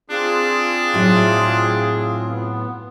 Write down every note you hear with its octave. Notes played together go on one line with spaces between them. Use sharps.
C4 D4 F4 G#4
A2 F#3
B3